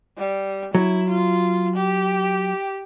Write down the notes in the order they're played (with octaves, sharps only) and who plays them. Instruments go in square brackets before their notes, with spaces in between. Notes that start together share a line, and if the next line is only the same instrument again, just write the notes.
[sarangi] G3
[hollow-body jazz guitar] F#3 [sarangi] E4
[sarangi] F4
G4